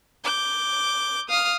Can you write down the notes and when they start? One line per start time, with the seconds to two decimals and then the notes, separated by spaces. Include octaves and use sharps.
0.24 D6 G6
1.28 F5 D#6 F6